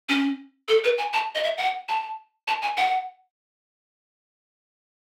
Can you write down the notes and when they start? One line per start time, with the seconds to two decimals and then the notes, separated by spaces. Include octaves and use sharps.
0.09 C#4
0.68 A4
0.84 B4
0.98 G#5
1.13 A5
1.35 D#5
1.43 E5
1.58 F#5
1.88 A5
2.47 A5
2.62 G#5
2.77 F#5